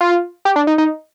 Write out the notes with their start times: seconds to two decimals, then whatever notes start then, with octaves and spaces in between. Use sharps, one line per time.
0.01 F4
0.45 G4
0.56 D4
0.67 D#4
0.78 D#4